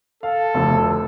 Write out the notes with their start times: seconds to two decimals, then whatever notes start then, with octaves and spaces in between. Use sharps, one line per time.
0.23 A4 F5
0.55 F1 D2